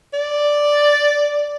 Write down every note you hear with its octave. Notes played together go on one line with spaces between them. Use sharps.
D5